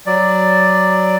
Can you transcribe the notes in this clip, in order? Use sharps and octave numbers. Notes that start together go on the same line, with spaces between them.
F#3 D5